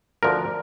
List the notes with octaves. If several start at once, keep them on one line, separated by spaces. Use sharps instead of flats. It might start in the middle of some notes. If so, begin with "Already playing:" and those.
D2 D3 F3 A#4